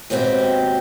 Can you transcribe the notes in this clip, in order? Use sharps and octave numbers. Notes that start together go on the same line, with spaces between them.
D#2 G#2 B2 C4 F#4 G4